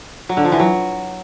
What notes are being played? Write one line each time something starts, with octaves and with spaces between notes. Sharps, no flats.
F#3
D3
F3
E3
F#3